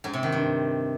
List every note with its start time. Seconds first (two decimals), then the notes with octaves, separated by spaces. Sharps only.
0.04 G#2
0.13 C3
0.23 D#3
0.32 G2